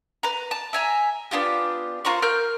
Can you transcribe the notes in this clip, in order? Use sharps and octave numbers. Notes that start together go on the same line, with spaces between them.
B4 A#5
A5
E5 G#5 A#5
B3 D4 F4 G4
F4 A#4 C5 C#6
A#4 F6 G6